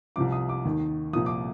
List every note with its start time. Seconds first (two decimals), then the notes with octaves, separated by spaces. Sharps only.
0.16 C2 C3 F3 D6
0.32 D#6
0.49 D6
0.65 D#2 D#3
1.13 C2 A#2 F3 D#6
1.26 D6